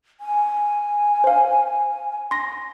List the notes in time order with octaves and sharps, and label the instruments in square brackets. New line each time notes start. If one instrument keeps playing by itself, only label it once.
[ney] G#5
[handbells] C5 F5
C6 A#6